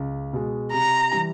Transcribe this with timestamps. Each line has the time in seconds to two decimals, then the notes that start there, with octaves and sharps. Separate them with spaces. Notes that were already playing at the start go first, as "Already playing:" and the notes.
Already playing: C#2
0.33 B2 G#3
0.72 C3 A#5
1.12 E3 G3